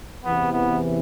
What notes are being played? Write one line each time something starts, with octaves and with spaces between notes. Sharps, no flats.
E2 C3 E3 B3
B3